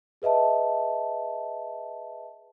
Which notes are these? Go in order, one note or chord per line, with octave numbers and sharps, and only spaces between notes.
G#4 B4 D#5 E5 A5